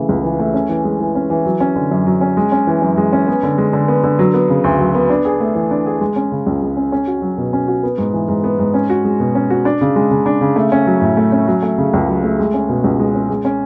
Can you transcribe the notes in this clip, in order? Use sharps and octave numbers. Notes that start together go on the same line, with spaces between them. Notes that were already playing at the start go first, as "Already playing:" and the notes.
Already playing: C#3 E3 A3
C#2
E3
A3
C#4
E3
G#3
E3
C#4
E3
F#3
C#4
D3
F#2
F#3
C#4
G#3
C#4
E3
F#2
G#3
C#4
B3
D3
G#3
D3
B3
D3
F#3
B3
C#3
D2
F#3
B3
D4
G#4
A3
E3
D4
G#4
G#3
C#4
C#3
C#2
G#3
C#4
C#4
F#4
F#3
B2
C#4
F#4
B3
G#2
E3
G#2
B3
G#2
C#4
F#4
G#3
B2
C#4
F#4
D4
C#3
G#3
C#3
D4
C#3
A3
C#4
F#3
A2
A3
C#4
F#3
A3
C#3
C#2
F#3
A3
G#3
C#4
B2
C#2
G#3
C#4
G#3
C#4